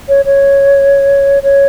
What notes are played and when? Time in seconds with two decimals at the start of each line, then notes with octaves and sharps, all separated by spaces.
0.09 C#5
0.25 C#5
1.43 C#5